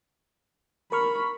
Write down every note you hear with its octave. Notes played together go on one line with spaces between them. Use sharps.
A#4 B5 C#6 F6